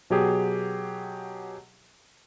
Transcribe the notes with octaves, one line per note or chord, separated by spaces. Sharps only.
B2 F#3 G4 G#4